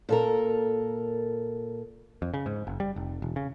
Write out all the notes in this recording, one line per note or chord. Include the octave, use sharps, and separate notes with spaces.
A#2 A4 A#4
F2
C#3
G#2
F#1
G3
F1
E1
C#3